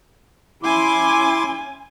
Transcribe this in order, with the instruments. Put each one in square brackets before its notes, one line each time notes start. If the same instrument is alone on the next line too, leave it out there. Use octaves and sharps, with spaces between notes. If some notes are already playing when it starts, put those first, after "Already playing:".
[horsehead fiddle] C#4 G#5 [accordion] E4 C6 D6